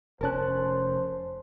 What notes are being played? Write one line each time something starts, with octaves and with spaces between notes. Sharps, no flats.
F1 C#4 A#4 C5 A5 F#6